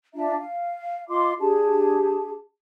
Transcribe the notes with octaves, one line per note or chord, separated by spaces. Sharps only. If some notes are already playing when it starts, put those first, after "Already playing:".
D4 F4 E5 A#5
F5
F4 D#5 C6 D6
D4 G4 G#4 A5